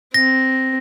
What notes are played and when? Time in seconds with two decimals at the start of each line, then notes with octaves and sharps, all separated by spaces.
0.14 C4 A#6